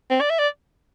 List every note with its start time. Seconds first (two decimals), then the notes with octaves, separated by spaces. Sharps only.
0.10 C4
0.21 D5
0.30 E5
0.39 D5